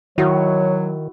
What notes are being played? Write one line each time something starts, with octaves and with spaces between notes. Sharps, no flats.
D#3 F#3 E4 F#4 C#5